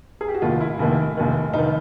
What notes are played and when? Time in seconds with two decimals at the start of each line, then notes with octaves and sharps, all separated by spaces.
0.21 G#4
0.28 G4
0.35 F#4
0.42 F1 D#2 D#3 F4
0.60 E4
0.79 F1 D#2 D#3
1.17 F1 D#2 D#3
1.54 F1 D#3 D#4